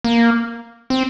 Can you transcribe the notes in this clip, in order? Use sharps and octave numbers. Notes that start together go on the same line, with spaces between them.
A#3
C4